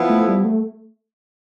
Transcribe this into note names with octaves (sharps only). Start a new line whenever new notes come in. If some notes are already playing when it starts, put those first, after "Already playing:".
Already playing: F3 B3 E4
A3
G3
A3